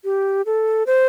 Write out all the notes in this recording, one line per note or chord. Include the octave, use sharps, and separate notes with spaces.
G4
A4
C5